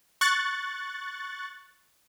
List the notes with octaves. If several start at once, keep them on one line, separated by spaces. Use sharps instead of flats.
C#6 F#6 A6